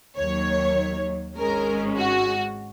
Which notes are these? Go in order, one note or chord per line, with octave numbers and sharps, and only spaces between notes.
D#2 D#3 F#3 C#5
G#1 G#2 G#3 C#4 A#4
F#4